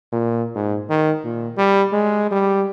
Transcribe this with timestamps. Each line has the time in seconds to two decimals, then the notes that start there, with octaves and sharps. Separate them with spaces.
0.12 A#2
0.55 G#2
0.89 D#3
1.24 A#2
1.57 G3
1.93 G#3
2.31 G3